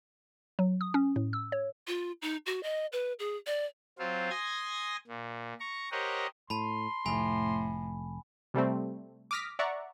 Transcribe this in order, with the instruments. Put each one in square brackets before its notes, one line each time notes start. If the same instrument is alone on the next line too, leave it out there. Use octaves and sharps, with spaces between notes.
[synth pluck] F#3
D#6
C#4
A2
E6
C#5
[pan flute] F4
D#4
F#4
D#5
B4
G#4
D5
[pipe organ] F#3 C4 F4 C5
G#5 C6 D#6 G#6 A#6
A#2
A#5 C#6
G4 A#4 C5 C#5 D#5 F#5
[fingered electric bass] A2 [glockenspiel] A5 B5 [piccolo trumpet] C6
[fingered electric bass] F1 [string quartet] A2 [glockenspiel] G#5 B5
[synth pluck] C3 G3 A3 C4
D6 D#6 F6 A#6 B6
D5 E5 F#5 A#5 C#6